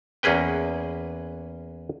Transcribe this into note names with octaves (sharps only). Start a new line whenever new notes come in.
E2 A#3 C#4 G#4 B4 G5